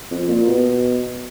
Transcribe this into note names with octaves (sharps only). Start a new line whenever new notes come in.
F2
A#2
B2